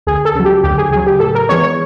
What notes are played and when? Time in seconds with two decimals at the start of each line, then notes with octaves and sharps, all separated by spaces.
0.07 D2 G#4
0.25 A4
0.35 C#3 F#3
0.45 G4
0.63 D2 G4
0.78 G#4
0.91 C#3 F#3 G#4
1.07 G4
1.20 A2 A4
1.35 A#4
1.49 E3 G#3 B3 C#5
1.62 C#5